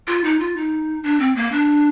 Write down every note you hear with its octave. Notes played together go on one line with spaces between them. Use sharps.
F4
D#4
F4
D#4
D4
C4
A#3
D4